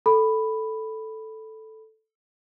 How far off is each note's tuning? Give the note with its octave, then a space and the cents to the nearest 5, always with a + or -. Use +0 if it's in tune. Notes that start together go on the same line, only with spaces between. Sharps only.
A4 +0 B5 +0